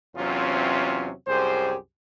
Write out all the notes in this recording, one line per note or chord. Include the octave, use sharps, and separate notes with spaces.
E2 C3 F#3 C4 C#4 F4
C2 F#2 G4 G#4 C5